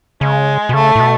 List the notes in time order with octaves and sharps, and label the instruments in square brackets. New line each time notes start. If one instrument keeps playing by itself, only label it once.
[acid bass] C#3 [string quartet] G#3
[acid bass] B2
[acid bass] C#3 [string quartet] A3
[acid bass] A2
B2